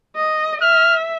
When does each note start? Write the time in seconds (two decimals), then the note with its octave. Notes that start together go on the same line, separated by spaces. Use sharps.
0.16 D#5
0.62 E5 F6